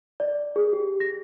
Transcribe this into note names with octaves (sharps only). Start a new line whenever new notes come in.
D5
G#4
G4
A#6